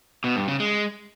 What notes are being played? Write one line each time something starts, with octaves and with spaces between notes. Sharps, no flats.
B2
G2
C#3
G#3